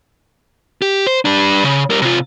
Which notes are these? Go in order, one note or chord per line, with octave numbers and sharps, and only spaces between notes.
G4
C5
G3 D4
C#3
G3 A#4
C3 F4